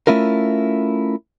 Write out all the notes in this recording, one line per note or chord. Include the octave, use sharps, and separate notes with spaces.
A3 C#4 E4 F4 A#4